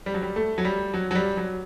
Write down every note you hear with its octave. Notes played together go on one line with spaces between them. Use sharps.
G3
F#3
G3
A3
F#3
G3
F#3
F#3
G3
F#3